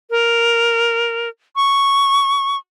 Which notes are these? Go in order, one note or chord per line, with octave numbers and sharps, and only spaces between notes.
A#4
C#6